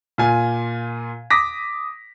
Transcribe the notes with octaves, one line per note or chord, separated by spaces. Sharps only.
A#2 F4 G#5
D6 D#6 A#6 B6